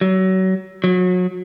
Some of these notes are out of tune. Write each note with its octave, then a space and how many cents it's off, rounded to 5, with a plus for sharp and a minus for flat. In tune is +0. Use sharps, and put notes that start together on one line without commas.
F#3 +30
F#3 -30